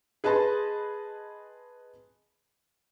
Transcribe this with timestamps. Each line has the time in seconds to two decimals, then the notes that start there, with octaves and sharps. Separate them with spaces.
0.24 G#4 B4 D#5 A5 B5 C6